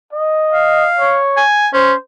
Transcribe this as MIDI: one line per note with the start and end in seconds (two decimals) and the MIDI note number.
0.13 0.88 75
0.53 1.18 77
0.99 1.44 73
1.37 1.68 80
1.73 1.93 61
1.73 1.95 72